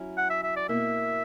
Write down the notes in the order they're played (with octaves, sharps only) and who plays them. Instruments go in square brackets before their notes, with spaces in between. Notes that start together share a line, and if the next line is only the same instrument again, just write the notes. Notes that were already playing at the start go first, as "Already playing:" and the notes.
Already playing: [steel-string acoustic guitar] F#3 C#4 E4
[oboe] F#5
E5
E5
D5
[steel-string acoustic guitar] B2 A#3 E4 [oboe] E5